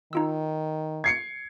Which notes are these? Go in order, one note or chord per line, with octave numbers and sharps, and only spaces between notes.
D#3 D#4 F4 E6
G#6 C7 C#7